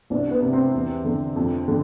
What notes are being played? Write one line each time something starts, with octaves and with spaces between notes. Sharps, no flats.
C2 D4
B3
C3
C4
E2
D3
F2
D3